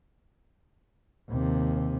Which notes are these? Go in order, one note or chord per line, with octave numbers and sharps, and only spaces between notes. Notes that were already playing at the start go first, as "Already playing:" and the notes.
D#2 C3